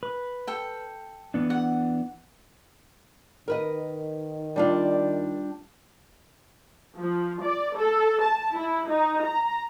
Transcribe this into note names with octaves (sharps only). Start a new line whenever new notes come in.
B4
A4 G5
E3 B3 D4
F#5
D#3 A#4 B4 D#5
G3 D4 F4
F3
D5
A4
A5
E4
D#4
A#5